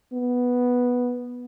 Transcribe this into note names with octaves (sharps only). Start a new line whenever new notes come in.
B3